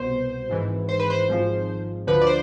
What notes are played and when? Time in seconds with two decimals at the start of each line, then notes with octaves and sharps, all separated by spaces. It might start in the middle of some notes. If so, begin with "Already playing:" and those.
Already playing: C2 B2 C5
0.49 G#1 G#2 E3
0.89 C5
1.00 B4
1.10 C5
1.28 G#1 G#2 F3
2.07 D2 D3 F3 B4
2.21 D5
2.27 C5